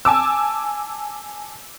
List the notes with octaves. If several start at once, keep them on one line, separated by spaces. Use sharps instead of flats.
G#5 A5 D6 E6